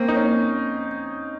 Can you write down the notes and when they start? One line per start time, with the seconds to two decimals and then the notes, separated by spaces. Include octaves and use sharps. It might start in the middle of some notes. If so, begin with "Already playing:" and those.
Already playing: A#3 C4 C#4
0.08 D#4
0.16 C#4